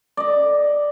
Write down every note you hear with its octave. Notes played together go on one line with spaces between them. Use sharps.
D5 D#5